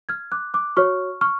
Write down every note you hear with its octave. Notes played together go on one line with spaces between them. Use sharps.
F6 G#6
D6 F#6
D6 F#6
F#4 C#5 C#6 F6
C#6 F6